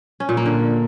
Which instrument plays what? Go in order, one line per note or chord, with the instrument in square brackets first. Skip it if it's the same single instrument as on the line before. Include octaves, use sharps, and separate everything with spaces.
[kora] C#4
A#2
A#3
D3